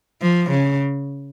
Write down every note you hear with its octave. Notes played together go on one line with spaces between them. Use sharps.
F3
C#3